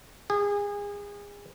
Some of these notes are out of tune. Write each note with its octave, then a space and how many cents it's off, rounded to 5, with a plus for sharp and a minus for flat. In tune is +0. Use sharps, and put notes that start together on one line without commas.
G#4 -30